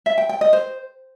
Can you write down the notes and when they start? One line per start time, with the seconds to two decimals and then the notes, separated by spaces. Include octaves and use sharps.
0.06 E5
0.18 G5
0.29 G5
0.41 D#5
0.53 C5